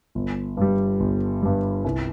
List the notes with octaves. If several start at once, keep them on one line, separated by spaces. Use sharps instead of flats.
G1
G2 G3
G1
G2 G3
C2